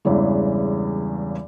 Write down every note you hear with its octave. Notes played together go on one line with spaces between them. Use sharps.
E2 G2 C#3 E3 G#3